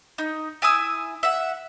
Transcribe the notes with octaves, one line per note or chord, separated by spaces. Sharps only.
D#4
E4 G#5 D#6 E6
E5 F#5